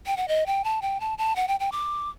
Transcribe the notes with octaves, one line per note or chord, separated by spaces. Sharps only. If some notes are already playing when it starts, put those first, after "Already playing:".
G5
F#5
D#5
G5
A5
G5
A5
A5
F#5
G5
G5
D6